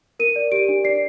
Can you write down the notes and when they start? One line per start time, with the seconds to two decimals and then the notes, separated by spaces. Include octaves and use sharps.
0.19 A#4 D#7
0.36 D5
0.52 G4 D7
0.69 D4
0.84 D5 C7